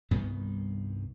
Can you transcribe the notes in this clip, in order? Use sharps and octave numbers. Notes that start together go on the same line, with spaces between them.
C2 G2 D#3 B3